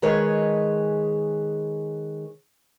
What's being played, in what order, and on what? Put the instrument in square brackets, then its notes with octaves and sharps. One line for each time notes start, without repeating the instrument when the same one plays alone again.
[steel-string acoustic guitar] D#3 G#3 G#4 B4 C#5